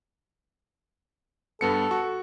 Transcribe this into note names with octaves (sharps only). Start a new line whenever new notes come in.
G2 B3 A4 C#7
F#4 C#6